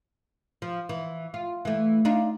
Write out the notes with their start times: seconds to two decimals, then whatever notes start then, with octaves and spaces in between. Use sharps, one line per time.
0.62 F3
0.89 E3
1.34 F4
1.65 E3 A3
2.05 D4 D#4 F4